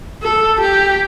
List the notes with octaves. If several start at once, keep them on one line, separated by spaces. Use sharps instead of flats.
A4
G4